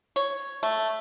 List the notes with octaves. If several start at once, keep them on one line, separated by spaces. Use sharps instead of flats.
C#5
A3